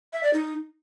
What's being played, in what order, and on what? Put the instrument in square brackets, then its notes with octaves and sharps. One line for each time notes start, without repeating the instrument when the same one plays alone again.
[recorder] E5
D5
D#4